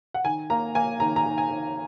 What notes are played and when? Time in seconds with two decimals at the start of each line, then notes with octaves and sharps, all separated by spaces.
0.14 F#5
0.25 D#3 G#5
0.50 A#3 A#5
0.75 A#3 G#5
1.00 D#3 A#5
1.16 A#5
1.26 D#3
1.38 G#5
1.50 D#3